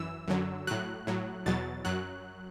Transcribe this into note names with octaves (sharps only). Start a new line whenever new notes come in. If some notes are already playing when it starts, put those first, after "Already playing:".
Already playing: F#2 E3 E6
F#2 D3 F#3
A2 F#3 F#6
A2 F#3
E2 B2 F#3 A6
F#2 F#3 F#6